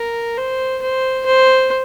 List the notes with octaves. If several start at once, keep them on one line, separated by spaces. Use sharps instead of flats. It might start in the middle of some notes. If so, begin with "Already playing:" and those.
Already playing: A#4
C5
C5
C5